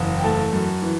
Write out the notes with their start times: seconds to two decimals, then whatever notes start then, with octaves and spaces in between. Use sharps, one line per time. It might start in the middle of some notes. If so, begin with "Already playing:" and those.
Already playing: F#1 E2
0.18 G5
0.24 A3 A5
0.52 F#2
0.82 E3